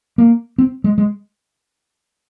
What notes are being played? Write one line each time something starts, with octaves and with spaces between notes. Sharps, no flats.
A#3
C4
G#3
G#3